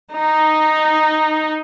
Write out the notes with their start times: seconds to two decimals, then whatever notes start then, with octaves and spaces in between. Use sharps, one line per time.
0.14 D#4